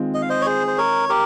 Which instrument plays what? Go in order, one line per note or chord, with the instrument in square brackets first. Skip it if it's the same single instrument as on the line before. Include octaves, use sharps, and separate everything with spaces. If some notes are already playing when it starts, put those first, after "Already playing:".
Already playing: [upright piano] D#3 G#3 C4 F4
[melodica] D#5
F5
C5 D#5
C#5
G#4 C5
C5
A#4 C#5
G4 A#4